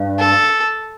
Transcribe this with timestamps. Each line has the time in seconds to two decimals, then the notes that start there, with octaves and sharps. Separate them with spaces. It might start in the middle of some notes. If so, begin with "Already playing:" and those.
Already playing: G2
0.19 A4